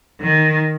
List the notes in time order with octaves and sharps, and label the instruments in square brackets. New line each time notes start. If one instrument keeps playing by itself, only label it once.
[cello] D#3